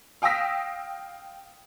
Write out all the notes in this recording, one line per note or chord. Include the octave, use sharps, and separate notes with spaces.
F5 G5 D#6 E6 A#6 B6